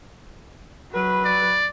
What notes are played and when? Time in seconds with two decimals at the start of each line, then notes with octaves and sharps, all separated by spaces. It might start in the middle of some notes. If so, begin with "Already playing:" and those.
0.92 F#3 B4
1.25 D5